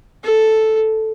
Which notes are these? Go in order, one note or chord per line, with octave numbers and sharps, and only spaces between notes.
A4